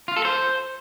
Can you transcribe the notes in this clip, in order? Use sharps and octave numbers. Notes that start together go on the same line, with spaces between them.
F4
A4
C5